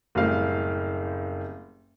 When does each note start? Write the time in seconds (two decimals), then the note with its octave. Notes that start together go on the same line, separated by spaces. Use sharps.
0.15 F#1 A2 G3 C4 F5